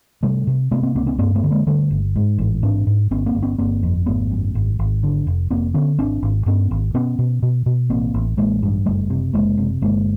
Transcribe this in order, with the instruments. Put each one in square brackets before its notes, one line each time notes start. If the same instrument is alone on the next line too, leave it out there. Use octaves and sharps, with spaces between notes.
[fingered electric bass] C3 G3 A3
C3
C3 A3 B3
A#3 C4
C#2 A#3 C4
B3 C#4
G2 A#3 C4
A3 B3
D3
G#3 A#3
D3 G3 A3
G1
G#2
A1
G#2 C4 D4
G#2
G1 B3 C#4
A#3 C4
G1
B3 C#4
G1 A#3 C4
F2
G#1 A3 B3
F#2
G#1
G#1
D3
F1
F1 A#3 C4
D3 B3 C#4
G#1 C4 D4
G#1
G2 B3 C#4
G#1
B2 B3 C#4
B2
B2
B2
A1 A#3 C4
A1
A1 G#3 A#3
G2
F#1 G3 A3
C3
F#1 G#3 A#3
C3
G1 G#3 A#3